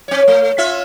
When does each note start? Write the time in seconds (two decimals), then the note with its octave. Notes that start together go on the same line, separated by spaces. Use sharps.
0.08 C4 C#5
0.28 A3
0.58 C#4 F4 E5